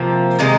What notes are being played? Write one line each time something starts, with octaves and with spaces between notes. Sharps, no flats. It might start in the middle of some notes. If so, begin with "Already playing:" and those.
Already playing: C3 F3 A#3
C3 D#3 G#3 D#4